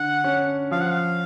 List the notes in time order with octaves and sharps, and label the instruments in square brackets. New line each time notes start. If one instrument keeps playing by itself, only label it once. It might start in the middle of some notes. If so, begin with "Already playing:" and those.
Already playing: [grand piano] D3 [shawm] F#5
[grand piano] C#4
[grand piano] F3 [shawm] F5
[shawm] F#5
F5